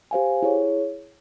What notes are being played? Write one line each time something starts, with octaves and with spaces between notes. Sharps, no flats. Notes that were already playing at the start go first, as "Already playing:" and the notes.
G4 C5 F5 G#5
E4 G#4 C#5